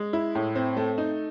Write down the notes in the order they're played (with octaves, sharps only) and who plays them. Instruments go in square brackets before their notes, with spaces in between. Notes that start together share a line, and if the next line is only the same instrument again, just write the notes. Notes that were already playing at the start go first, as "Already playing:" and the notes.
Already playing: [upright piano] G#3
E4
A2
C4
A3
D#4